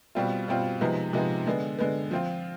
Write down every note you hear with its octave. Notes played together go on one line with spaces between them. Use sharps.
B2 G3 C4 F4
B2 G3 C4 F4
C3 F3 G#3 B3 D#4
C3 F3 G#3 B3 D#4
D3 G#3 B3
D3 G#3 B3
F3 C4 F4